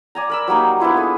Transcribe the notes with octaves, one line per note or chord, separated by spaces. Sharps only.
D5 G#5 A#5
A#4 B5 E6
F#3 G3 A#3 D#4
B3 D4 E4 F4
G#4 A4